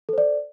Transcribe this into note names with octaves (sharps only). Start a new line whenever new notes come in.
A4 C5 D5